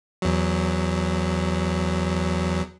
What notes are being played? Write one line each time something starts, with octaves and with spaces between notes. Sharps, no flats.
E2 F#3